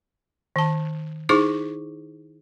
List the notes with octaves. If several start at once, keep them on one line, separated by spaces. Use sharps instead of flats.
D#3 A5
D#4 E4 G#4 C5 C#6 D6